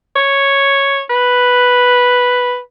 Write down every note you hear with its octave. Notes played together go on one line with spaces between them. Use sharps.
C#5
B4